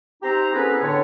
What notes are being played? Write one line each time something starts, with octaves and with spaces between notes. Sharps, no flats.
C4 D#4 G4 C5 A#5
B3 C#4 E4 G#4 A4 B4
A2 D3 C4 D4 C#5